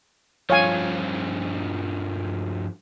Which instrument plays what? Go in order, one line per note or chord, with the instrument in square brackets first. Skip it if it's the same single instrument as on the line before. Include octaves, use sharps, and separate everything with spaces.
[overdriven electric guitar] G2 F3 [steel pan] C#5 F5 G#5